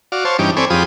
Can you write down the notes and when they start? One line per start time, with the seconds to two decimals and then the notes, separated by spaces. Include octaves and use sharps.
0.12 F#4 D5 F5
0.25 C5 C#5 F5 A5
0.39 G2 E3 C#4 D#4 G4 D6
0.57 C4 A4 C#5 D5 G#5 B5
0.70 F2 F4 G4 G#4 B5 D#6